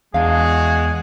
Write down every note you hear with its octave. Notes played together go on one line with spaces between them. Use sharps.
E2 G#3 D4 F#4 G#4 F5